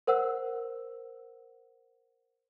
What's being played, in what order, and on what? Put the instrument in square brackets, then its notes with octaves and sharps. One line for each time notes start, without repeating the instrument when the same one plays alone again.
[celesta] A#4 C5 F#5 E6